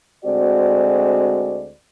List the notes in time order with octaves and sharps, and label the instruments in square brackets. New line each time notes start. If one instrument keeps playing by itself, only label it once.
[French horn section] D2 G#3 C4 F#4 D5